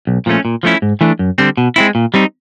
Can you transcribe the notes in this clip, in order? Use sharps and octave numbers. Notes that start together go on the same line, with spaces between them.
B1
A#2 F3 A3 C#4
A#2
F3 A3 C#4 E4
G#2
E3 A3 D4
F#2
D3 G3 C4
B2
G#3 C4 E4
A#2
G3 C4 D#4